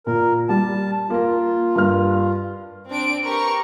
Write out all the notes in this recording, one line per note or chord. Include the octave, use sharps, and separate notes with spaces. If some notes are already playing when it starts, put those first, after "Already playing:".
A#2 A#4
G3 A5
A#3 F4 A#4
G2 A#4 F6
C4 D4 D7
G4 A#4 B4 C#6